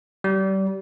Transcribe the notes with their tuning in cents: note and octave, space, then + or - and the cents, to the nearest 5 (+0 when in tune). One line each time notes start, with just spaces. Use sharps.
G3 -30